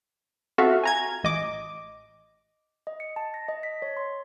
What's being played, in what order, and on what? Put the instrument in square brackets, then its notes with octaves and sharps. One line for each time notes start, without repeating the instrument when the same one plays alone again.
[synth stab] C4 F4 F#4 A4 E5 F5
G#5 A#5 G#6
A1 D#5 D6
[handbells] D#5
C#7
A5
A#6
D#5
B6
C#5
C6